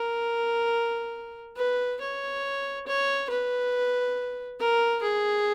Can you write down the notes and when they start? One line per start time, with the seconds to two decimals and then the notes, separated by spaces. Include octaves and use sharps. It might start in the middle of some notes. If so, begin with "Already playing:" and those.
Already playing: A#4
1.57 B4
2.01 C#5
2.87 C#5
3.30 B4
4.60 A#4
5.02 G#4